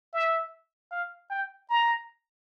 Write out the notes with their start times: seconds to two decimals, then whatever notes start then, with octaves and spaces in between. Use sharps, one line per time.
0.14 E5
0.91 F5
1.30 G5
1.70 A#5